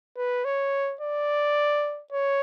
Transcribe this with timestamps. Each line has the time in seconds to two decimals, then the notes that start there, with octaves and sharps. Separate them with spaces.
0.17 B4
0.45 C#5
1.01 D5
2.13 C#5